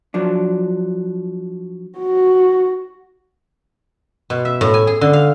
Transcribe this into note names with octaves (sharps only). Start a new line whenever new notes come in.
F3 F#3 D4
F#4
B2
E5
A2
G#5
G#4
D3
F5